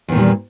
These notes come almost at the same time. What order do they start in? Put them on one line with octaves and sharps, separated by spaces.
E2 D#3 A#2 G3